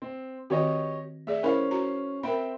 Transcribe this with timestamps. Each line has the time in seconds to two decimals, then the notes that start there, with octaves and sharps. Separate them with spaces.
0.02 C4
0.50 D#3 C4 F#4 G4 C#5 D#5
1.27 A3 G#4 D5 E5
1.43 C#4 E4 A#4 C5 F5 B5
1.71 F#4 A#5
2.23 C4 A#4 E5 G5 B5